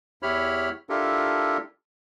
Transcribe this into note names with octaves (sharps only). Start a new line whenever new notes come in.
E2 E4 G4 C#5 B5 F6
D4 E4 F4 G4 A4 A#4